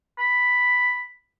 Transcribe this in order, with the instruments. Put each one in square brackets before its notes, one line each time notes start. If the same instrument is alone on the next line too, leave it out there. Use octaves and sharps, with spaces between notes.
[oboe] B5